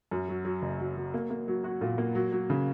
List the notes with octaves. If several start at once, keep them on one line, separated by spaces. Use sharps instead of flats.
F#2
F#3
F#3
F#1
F#3
F#3
A#3
A#3
F#3
F#4
A#2
A#3
F#3
F#3
C#3